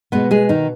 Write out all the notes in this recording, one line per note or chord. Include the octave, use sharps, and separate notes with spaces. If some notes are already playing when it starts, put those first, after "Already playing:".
B2 G#3 B3 B4
G#3 G#4
D#3 D#4